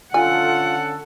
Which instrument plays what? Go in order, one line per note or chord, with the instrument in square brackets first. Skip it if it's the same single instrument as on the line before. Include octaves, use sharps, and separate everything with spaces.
[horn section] D3 C#4 A4 [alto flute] F4 [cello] F#5 [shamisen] G#5